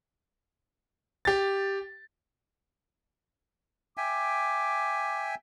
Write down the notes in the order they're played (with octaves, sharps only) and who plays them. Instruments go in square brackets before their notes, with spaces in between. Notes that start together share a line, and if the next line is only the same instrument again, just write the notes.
[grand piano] G4 A6
[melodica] E5 G5 G#5 [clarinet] D6